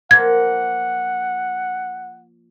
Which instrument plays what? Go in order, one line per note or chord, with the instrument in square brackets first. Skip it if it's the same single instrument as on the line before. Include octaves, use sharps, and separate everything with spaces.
[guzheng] F3 A#3 [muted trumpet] F#5 [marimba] G#6